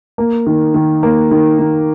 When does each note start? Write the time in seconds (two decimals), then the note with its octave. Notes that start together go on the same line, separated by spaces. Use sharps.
0.18 A#3
0.47 D#3
0.74 D#3
1.03 A#3
1.31 D#3
1.59 D#3